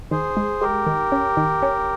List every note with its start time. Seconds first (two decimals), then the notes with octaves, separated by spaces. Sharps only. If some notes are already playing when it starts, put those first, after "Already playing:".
0.11 D#3 G#4 C5
0.37 G#3
0.61 G#3 G4 A#4
0.87 D#3
1.12 C#4
1.37 D#3
1.63 C#4